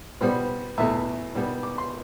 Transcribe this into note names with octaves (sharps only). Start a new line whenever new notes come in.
B2 G3 B3 C5
E2 B2 A3 E5
B2 G3 B3
D6
C6